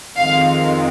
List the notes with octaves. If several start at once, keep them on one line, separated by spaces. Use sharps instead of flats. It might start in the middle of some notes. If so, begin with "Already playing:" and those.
F2 D#3 G#3 C4 F5